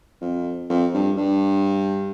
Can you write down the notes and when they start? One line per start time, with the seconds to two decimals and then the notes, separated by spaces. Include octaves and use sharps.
0.21 F2
0.69 F2
0.94 G2
1.17 G2